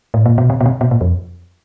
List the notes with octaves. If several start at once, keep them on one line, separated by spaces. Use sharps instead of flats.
A2
A#2
B2
C3
B2
C3
B2
A#2
F2